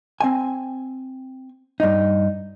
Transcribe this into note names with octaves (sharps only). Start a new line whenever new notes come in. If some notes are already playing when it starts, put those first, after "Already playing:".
C4 G#5
G2 D#4